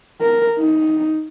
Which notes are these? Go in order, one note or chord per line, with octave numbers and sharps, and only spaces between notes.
A#4
D#4